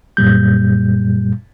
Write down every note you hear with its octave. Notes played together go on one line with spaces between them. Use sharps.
F#2 A#2 G3 G6